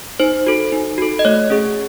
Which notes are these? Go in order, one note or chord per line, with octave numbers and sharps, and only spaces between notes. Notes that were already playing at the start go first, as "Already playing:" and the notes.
D#4 C5
F#4 A4
D#4
F#4 A4
D#5
A3 C#5
C#4 G#4